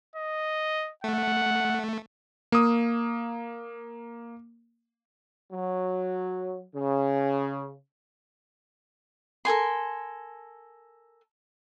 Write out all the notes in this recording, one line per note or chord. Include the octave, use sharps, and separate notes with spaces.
D#5
A3 F#5
A#3 D#6
F#3
C#3
A4 A#4 G#5 C6